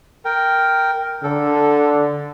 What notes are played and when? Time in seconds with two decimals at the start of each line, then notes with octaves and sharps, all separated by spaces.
0.25 A#4 G5
1.23 D3 A4